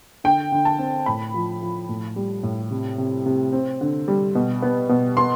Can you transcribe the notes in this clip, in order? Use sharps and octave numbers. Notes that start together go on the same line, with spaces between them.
D3 G5
D3
A5
C4
A2 B5
F3
F3
A2
G3
A2
C3
C3
C3
C4
D3
G3
B2
B3
B2
B3 C6